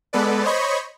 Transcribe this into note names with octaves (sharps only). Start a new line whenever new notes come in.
G#3 B3 A4 B4 D5
C5 C#5 D#5 B5 C#6